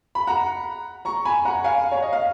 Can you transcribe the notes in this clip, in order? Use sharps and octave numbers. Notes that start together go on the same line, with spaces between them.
B5
F#5 A#5
A#5 C#6
G#5 B5
F#5 A#5
F5 G#5
C#5
D#5
F5